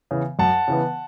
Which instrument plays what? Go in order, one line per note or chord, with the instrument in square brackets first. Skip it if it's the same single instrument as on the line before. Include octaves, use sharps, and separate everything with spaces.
[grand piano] C#3 E3 B3
F#2 F#5 A5
C#3 E3 B3